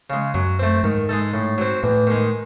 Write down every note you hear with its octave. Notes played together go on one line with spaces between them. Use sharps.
C#3 G#3
F#2 F#3
A3 C4
G#2 D#3
G#3 D#4 A4
A2
F#3 C4
E2 A2
D#3 G#3 D#4